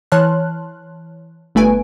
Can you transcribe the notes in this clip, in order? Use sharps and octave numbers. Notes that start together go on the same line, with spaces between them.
E3 C#5 A5 C6 F6 F#6
G1 A3 B4 G#5 D7